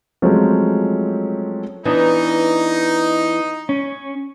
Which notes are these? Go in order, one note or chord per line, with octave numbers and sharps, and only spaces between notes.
F3 F#3 G#3 A3 C4 C#4
E3 B3 D4 D#4
C#4